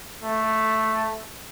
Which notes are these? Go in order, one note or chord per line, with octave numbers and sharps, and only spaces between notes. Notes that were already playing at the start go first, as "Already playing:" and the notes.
A3